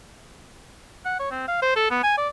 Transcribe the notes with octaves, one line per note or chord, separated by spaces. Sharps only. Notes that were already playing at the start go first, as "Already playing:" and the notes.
F#5
C#5
C4
F5
C5
A4
B3
G#5
D5